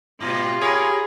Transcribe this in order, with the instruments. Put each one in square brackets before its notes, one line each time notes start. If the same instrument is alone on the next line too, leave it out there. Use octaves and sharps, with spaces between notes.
[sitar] G#2 B2 G3 [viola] F4
[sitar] G4 A#4 C#5 [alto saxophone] G#4 [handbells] G#5 B5